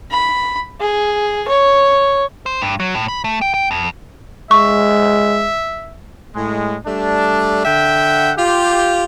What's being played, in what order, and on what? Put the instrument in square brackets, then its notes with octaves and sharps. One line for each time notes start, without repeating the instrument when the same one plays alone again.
[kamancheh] B5
G#4
C#5
[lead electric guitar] C5
G2
F#3
A2
B5
A3
G5
G5
F2
[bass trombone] G#3 [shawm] E5 [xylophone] C#6
[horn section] A2 G#3
G3 A3 D4
D3 E5 F#5 G5
F4 G4